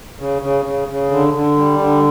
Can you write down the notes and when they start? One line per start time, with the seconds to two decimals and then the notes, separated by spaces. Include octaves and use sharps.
0.19 C#3
0.42 C#3
0.65 C#3
0.88 C#3
1.11 D3
1.34 D3
1.57 G3
1.79 D3